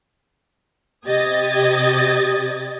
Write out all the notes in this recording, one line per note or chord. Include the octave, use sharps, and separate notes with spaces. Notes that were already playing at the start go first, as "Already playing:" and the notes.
C3 G4 D#5 D#6 G#6 A6